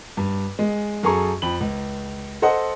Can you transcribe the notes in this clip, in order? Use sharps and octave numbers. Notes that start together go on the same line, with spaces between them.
G2
G#3
F#2 G#4 A4 A#5 C#6
F2 B5 F#7
C#2
A4 C5 D#5 F#5